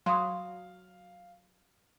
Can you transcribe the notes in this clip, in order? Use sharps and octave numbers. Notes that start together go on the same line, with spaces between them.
F#3 F5 C6 D#6